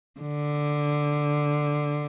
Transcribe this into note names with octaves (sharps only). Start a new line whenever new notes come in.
D3